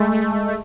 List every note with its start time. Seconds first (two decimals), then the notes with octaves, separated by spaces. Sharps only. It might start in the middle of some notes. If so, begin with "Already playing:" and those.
Already playing: G#3 A3
0.12 A3
0.32 A3
0.48 A3